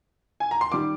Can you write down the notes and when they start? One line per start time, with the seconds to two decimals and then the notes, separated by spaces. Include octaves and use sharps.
0.40 G#5
0.51 A#5
0.61 C6
0.72 D#3 G3 D6